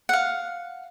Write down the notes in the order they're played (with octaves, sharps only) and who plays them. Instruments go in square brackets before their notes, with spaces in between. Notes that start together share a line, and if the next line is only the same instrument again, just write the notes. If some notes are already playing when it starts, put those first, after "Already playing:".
[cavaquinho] F5 F#5